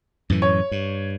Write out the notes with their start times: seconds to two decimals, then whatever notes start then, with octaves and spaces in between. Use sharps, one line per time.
0.30 F#2 A2 E3
0.42 C#5
0.71 G2